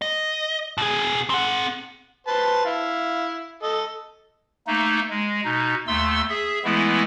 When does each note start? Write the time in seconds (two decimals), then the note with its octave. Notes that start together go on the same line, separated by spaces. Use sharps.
0.02 D#5
0.78 B2 G#4
1.30 C4 F#5
2.27 B4 C5 A5
2.65 E4 F5
3.63 A4 D#5
4.67 A3 A#3 D#4
5.10 G#3
5.45 B2 D#4
5.87 D#2 A3 C6 E6
6.29 G#4 E5
6.64 E3 G#3 A3 B3 E4